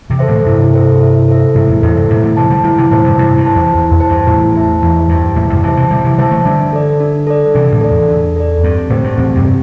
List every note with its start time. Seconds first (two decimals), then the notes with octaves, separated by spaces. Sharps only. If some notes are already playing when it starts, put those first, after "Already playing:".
0.10 C3 E3
0.19 A4 C5 E5
0.28 A2 D3
0.46 G2 C3 E4
0.74 A4 C5 E5
1.01 E4
1.28 A4 C5 E5
1.55 G2 C3 E4
1.68 E2 A2
1.82 E2 A2 A4 C5 E5
1.96 G2 C3
2.10 A2 D3 E4
2.23 A2 D3
2.37 C3 E3 C5 A5
2.50 D3 G3
2.64 D3 G3 E4
2.78 C3 E3
2.91 A2 D3 C5 A5
3.04 G2 C3
3.18 G2 C3 E4
3.37 G2
3.45 C5 A5
3.55 E2
3.73 E2 E4
3.91 E2
4.00 C5 A5
4.09 G2
4.27 E2 A2 E4
4.55 C5 E5 A5
4.82 E2 E4
5.09 G2 C5 E5 A5
5.36 E2 A2 E4
5.50 G2 C3
5.64 C3 E3 C5 E5 A5
5.77 C3 E3
5.91 D3 G3 E4
6.04 C3 E3
6.18 D3 G3 C5 E5 A5
6.31 E3 A3
6.45 D3 G3 D4
6.73 A4 D5
7.00 D4
7.27 A4 D5
7.54 C3 E3 D4
7.72 A2 D3
7.81 A4 D5
7.91 E2
8.08 D4
8.36 A4 D5
8.63 G2 C4
8.90 A2 D3 G4 C5
9.04 G2
9.17 E2 A2 C4
9.35 G2 C3
9.45 G4